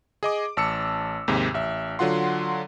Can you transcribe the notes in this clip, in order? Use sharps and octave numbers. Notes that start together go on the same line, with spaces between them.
G#4 D#5 D6
A1 A5 E6 C#7
D#2 G#2 C3
A1 E5
D3 F#3 F4 F#5 C6